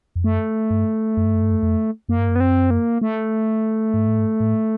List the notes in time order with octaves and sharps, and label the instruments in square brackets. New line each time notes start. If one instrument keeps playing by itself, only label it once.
[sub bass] F2
[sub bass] F#2 [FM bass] A3
[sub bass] G2
F#2
G2
F#2
G2
F#2
F2
[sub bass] F#2 [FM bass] A#3
[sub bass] G2
F#2
[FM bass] B3
C4
A#3
A3
[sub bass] G#2
A2
G#2
A2